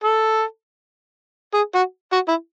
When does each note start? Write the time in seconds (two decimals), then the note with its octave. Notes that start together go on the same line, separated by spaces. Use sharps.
0.04 A4
1.54 G#4
1.75 F#4
2.13 F#4
2.28 E4